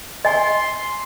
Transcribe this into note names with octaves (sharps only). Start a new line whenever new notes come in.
D#5 G#5 C6